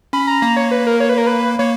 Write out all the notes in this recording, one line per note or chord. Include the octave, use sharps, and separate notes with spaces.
C#4 B5
A#5
A#3 A#5
C#5
B4
A#4
C#5
B4
A#4
B4
A#3 C#5